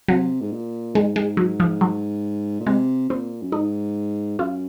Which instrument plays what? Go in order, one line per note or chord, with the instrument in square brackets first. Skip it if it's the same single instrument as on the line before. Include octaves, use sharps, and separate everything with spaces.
[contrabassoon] C3 [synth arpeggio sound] F#3
[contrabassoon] G#2
A#2
[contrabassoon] G#2 [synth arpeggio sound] G#3
[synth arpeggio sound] G#3
F#3
F3
F#3
[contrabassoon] A#2
[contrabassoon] C3 [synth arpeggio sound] G#3
[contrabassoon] A#2 [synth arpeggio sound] C4
[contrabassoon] F#2
[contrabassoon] G#2 [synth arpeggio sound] D#4
[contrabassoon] F#2 [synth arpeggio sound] F4